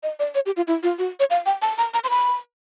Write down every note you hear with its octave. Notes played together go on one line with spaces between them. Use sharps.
D#5
D5
C#5
G4
F4
E4
F4
F#4
C#5
F5
G5
A5
A#5
A#5
C6
B5